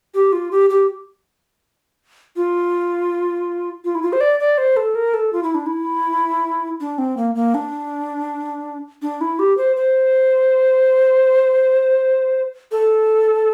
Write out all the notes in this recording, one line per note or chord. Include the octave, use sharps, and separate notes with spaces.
G4
F4
G4
G4
F4
F4
E4
F4
C5
D5
D5
C5
A4
A#4
A4
F4
E4
D4
E4
D4
C4
A#3
A#3
D4
D4
E4
G4
C5
C5
A4